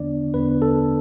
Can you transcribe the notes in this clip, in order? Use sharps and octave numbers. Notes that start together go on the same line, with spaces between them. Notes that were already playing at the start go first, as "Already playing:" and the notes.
Already playing: E2 D3 B3 D4 D5
E2 D3 B3 D4 B4
A4